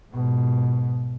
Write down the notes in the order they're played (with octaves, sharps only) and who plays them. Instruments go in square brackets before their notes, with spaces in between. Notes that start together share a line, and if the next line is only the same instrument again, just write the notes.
[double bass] G#2 B2